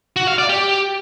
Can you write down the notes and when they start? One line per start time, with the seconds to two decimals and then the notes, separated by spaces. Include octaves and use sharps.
0.16 F#4
0.27 F5
0.38 D5
0.49 G4